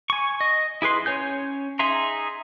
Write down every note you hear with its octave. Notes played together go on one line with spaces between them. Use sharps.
G#5 C#6
D#5
E4 G#4 B4 C6
C#4 C#5 G#5 G6
D#4 G#4 E5 A#5 C6